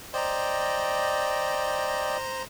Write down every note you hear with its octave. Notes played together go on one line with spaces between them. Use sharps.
C5 D5 D#5 G5 A#5